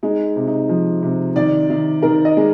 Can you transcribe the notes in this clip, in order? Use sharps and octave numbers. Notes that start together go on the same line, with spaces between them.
G#3 D#4
C3
D#4
F3
C3
D#3 D5
D#3
D#3 A#4
D#5
G#3